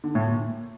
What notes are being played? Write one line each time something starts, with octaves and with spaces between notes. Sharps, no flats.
D3
A2
A#2